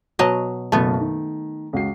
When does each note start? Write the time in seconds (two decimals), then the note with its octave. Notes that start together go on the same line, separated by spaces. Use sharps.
0.19 B2 F#3 D#5
0.72 F#1 B2 A3 B3 A5
1.01 D#3
1.73 C#2 F#4 C7